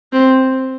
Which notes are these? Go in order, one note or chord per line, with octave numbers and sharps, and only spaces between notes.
C4